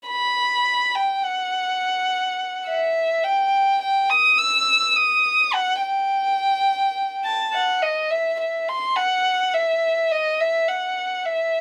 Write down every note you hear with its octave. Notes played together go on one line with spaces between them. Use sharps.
B5
G5
F#5
E5
G5
G5
D#6
E6
D#6
F#5
G5
A5
F#5
D#5
E5
E5
C6
F#5
E5
D#5
E5
F#5
E5